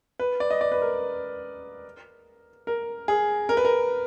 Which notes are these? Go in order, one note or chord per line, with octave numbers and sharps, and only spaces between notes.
B4
D5
D#5
D5
B4
A#4
A#4
G#4
A#4
B4
A#4